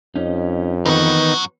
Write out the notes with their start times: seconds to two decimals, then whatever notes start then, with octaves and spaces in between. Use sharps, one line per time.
0.16 F2 C#4 D#4
0.85 F#2 D#3 E3 B3 F#4 B4